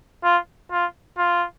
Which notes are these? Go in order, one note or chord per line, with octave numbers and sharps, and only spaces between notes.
F4
F4
F4